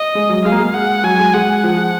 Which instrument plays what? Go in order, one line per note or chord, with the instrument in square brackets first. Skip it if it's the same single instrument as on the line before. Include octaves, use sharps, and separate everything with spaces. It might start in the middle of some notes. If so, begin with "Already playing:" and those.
Already playing: [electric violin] D#5
[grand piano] G#3
F#3
[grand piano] G#3 [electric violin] F5
[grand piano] A#3
G#3
[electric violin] F#5
[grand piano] F#3 [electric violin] G#5
[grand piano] G#3
[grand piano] G#3 [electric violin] F#5
[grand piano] F3